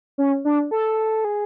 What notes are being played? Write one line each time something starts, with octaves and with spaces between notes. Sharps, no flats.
C#4
D4
A4
G#4